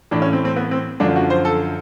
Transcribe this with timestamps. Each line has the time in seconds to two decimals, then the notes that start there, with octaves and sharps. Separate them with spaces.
0.11 A2 E3 D4
0.22 C#4
0.33 C4
0.45 C4
0.56 B3
0.71 C4
1.00 F#2 D3 F3 D4
1.16 F#4
1.30 C5
1.45 A4